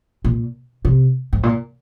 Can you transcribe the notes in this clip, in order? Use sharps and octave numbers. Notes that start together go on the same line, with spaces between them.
A#2
C3
G#2
A#2